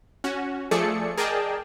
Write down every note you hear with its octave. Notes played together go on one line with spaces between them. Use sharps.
C#4 F#4
F3 A3 G#4 A4 D5 C#7
G#4 A#4 D5 D#5 G5 A5